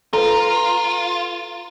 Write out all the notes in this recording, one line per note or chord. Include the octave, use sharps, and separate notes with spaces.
F4 A4 B4 A#5